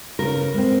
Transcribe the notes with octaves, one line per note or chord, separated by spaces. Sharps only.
C#3 A#4
G#3 C4